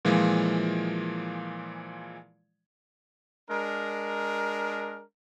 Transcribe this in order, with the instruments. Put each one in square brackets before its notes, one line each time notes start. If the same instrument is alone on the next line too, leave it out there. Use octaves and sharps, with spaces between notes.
[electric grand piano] A#2 E3 F3 G#3
[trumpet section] G#3 D4 A#4